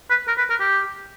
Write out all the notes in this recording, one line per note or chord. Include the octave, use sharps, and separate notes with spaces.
B4
A#4
B4
A#4
G4